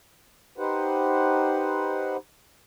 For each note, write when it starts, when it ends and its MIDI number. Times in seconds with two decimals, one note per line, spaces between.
0.58 2.17 63
0.58 2.17 67
0.58 2.17 71
0.58 2.17 72
0.58 2.17 78